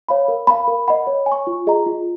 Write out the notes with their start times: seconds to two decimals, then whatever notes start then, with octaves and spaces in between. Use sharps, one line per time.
0.09 C#5 F5 B5
0.28 A#4
0.47 F5 B5
0.68 A#4
0.88 D#5 F#5 B5
1.07 C#5
1.26 G#5
1.32 C#6
1.47 F4
1.67 G#4 D#5 A#5
1.86 F4